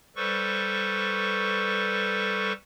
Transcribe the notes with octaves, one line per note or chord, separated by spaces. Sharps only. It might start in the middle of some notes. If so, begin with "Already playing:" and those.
G3 A4 B4 C5 C#6